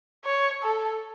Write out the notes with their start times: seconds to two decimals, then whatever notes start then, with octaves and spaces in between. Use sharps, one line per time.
0.25 C#5
0.63 A4